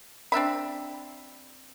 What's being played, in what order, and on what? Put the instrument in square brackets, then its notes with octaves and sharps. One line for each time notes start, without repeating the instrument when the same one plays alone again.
[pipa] C4 D4 E5 B5